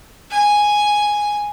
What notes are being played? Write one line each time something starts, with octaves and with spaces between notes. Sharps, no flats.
G#5